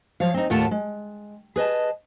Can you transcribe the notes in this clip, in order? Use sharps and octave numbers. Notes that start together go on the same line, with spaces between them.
F3 C#5 F5
C4 D#4
D#2 A2 A3 F4 F#5 A5
G#3
G#4 B4 D#5 A5